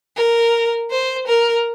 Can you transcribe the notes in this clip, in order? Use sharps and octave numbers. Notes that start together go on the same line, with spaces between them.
A#4
C5
A#4